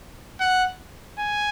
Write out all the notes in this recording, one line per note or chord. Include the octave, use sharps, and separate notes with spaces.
F#5
G#5